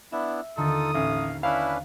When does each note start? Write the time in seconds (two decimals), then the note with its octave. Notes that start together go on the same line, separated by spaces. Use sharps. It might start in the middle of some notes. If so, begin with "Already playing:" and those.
0.12 B3 D4 E4 E5
0.57 D#2 D3 D#4 F4 A4 D#6
0.95 A1 F5
1.43 C#4 D4 E4 B4 F5